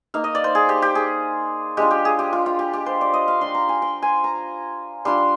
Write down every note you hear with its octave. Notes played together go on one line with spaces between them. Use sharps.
A#3 D#4 F5
D#5
D5
C5
G#4
G4
G4
G#4
G#3 D4 F4 G4
G4
G#4
G4
F4
F4
G4
G4
C5
D5
D#5
F5
G3 D4 F4 C6
A#5
G#5
G5
G#5
A#5
G3 D4 F4 C6